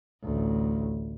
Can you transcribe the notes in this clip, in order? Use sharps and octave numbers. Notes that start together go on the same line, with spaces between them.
A1 D2